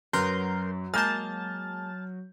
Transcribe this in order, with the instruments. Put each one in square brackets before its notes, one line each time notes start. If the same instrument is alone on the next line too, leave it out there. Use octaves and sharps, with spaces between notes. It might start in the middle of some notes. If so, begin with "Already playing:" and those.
[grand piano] F#2 [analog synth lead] F#3 [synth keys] A#4 C6 G6 [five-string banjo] B4
[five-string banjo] G#3 A#3 [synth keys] A5 A6 [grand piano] F6 G6